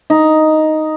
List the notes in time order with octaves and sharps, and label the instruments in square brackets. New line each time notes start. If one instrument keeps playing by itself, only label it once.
[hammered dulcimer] D#4